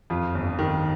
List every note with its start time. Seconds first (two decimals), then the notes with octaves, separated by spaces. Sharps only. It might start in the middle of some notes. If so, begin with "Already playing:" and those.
0.10 F2 F4
0.35 G1
0.59 D#3